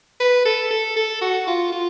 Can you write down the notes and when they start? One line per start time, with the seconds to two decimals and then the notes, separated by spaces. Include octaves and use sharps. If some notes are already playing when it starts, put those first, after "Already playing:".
0.20 B4
0.46 A4
0.71 A4
0.96 A4
1.21 F#4
1.47 F4
1.72 F4